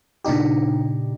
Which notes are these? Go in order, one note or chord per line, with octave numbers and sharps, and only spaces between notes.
A#2 C#3 D4 D#4 G4